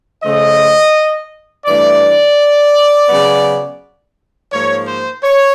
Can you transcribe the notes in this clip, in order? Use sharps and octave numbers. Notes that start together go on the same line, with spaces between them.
C#3 F3 A3 D#5
G2 E3 A3 D5
C#3 F#3 B3
G#2 F3 A#3 C#5
C5
C#5